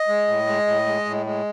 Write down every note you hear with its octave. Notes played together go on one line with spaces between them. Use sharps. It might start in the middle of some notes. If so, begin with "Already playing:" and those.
Already playing: D#5
G#3
A2
G#3
A2
G#3
A2
G#3